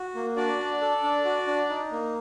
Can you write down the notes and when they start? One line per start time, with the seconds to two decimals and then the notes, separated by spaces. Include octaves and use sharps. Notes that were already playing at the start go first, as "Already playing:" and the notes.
Already playing: F#4
0.15 A#3
0.37 D4 F#4 D5
0.59 D4
0.81 A4
1.03 D4
1.25 F#4
1.47 D4
1.69 D#4
1.92 A#3